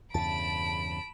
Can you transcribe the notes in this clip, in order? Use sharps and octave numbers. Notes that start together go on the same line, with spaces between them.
E2 G2 C#3 A5 B5 D7